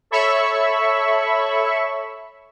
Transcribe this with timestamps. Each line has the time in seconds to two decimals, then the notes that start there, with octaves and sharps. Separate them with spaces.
0.11 A4 C#5 E5 B5 C#6 E6